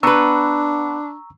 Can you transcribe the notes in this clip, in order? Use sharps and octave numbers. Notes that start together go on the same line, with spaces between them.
B3 D4 B4 A#5 C#6 E6